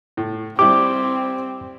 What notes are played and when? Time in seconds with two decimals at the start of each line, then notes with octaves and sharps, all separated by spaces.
0.17 A2
0.59 G3 C4 E4 G4 D6